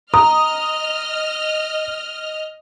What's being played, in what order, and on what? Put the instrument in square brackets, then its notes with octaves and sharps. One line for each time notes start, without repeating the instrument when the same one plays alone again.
[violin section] D#5 F6 [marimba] A#5 [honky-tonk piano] D#6